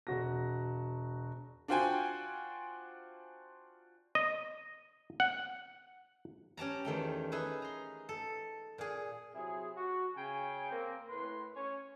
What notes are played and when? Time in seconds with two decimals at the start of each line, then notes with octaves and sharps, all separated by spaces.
0.07 E1 F#4 A#6
1.68 D4 F4 F#4 C5 G5 G#5
4.15 D#5
5.20 F#5
6.57 C#4 G4 A5 A#5
6.85 E2 D#3 A3 G5
7.32 D#4 G#4 B4 E5
7.62 A#5 C6
8.09 A4
8.78 A#2 G#4
9.35 C3 F#3 E4 G#4
9.76 F#4
10.15 C#3 G5 G#5
10.71 A#3 C4
11.08 A2 B4 C6
11.55 C#4 C#5